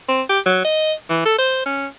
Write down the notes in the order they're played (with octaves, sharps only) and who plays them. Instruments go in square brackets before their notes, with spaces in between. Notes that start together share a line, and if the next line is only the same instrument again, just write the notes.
[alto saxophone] C4
G4
F#3
D#5
E3
A4
C5
C#4